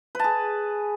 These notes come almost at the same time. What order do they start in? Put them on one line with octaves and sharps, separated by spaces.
B4 A5 G#4